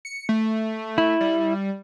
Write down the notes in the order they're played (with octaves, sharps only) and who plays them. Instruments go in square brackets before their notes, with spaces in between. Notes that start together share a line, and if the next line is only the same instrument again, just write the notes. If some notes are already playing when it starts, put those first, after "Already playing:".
[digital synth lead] C#7
A3
[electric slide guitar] E4
[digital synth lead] G3